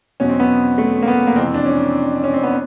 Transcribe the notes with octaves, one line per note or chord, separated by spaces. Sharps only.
E2 B2 F#3 C#4
C4
B3
A3
A#3
B3
A#3
F2 C3 E3 C4
D4
C#4
C#4
C4
B3